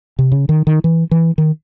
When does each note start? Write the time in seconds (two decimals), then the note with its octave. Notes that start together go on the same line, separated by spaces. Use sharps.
0.19 C3
0.32 C#3
0.49 D#3
0.67 D#3
0.84 E3
1.11 E3
1.38 D#3